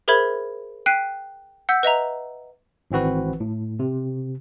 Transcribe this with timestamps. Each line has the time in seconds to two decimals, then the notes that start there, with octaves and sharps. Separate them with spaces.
0.08 G#4 A#4 C5 E5 B5 G#6
0.86 G5 F#6 B6 C7 D#7
1.69 F#5 E6 G6 B6
1.83 B4 D#5 E5 A#5
2.91 G#1 E3 C4 F#4 B4
3.40 A2
3.79 C3